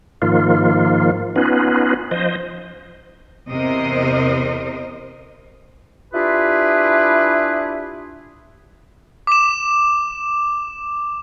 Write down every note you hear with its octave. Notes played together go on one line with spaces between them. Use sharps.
G#2 D#3 F3 A#3 F4
B3 C#4 D#4 F4 B4
F3 C5 D#5
E2 C3 A#4 C5 D#5
D4 E4 F4 G4 G#4 B4
D6 E7